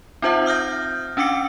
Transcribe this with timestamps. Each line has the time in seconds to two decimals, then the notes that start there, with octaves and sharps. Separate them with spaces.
0.22 C4 D#4 F4 C5 E5 F#5
0.46 D#6 F6 G6 A#6
1.17 C#4 D4 G5 D6 C#7